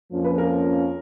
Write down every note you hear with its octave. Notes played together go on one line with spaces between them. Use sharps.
F2 F3 A#3 C#4
B4
A#4